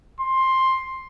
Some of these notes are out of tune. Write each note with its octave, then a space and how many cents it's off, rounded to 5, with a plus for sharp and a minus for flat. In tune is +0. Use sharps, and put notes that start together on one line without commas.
C6 +10